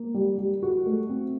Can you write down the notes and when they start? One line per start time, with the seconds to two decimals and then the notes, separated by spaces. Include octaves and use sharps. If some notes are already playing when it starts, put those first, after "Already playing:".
Already playing: A#3
0.14 G3
0.38 G3
0.63 F#4
0.86 A3
1.09 C4